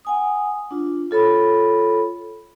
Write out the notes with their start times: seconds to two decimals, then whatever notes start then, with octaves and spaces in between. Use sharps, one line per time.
0.05 F#5 G#5 D#6
0.71 D4 F4
1.11 F4 A4 C#5 B5